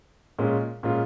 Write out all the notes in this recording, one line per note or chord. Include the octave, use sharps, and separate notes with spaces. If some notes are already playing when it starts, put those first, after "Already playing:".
A#2 G#3 C#4 F4
A#2 G#3 C#4 F4